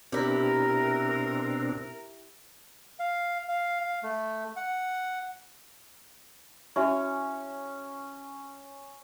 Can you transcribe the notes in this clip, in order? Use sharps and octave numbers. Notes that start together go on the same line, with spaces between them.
B2 C4 D4 E4 G4 A#4
F5
F5
F5
A3
F#5
C#4 E4 F#4 E5